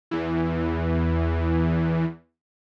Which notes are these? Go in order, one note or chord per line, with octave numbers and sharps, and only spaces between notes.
E2 E3